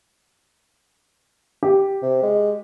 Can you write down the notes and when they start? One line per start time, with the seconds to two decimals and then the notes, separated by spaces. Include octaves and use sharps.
1.63 G4
2.02 C3
2.23 G#3